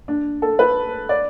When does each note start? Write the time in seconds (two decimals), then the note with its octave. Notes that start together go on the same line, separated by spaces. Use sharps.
0.08 D4
0.42 A4
0.59 B4
1.09 D5